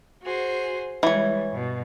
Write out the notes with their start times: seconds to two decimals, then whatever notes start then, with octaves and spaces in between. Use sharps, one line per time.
0.22 F#4 G#4 C5
1.03 E3 G3 G#3 C#5
1.50 G2 B2